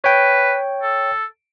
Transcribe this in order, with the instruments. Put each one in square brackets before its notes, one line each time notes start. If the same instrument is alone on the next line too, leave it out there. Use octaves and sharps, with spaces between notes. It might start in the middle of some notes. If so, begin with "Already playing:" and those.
[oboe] B4 [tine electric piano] C#5 G5
[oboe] A4